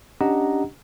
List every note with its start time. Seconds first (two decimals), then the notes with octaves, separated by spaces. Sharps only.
0.21 C#4 D4 G4 D#5 F#5 A#5